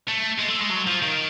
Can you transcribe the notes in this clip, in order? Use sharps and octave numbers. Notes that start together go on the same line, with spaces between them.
A3
G#3
A3
G#3
F#3
F3
D#3